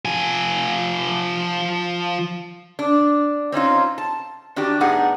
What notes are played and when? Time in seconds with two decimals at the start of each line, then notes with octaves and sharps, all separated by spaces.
0.05 F3 G#5
2.79 D4
3.52 C4 C#4 D#4 F4
3.98 A5
4.56 D#3 D4 F#4 G4
4.80 A2 G3 B3 D#4 G#4 F#5